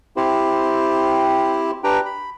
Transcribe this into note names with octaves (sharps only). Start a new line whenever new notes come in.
C4 E4 G4 C5
D4 G4 B4 G5 A#5
B5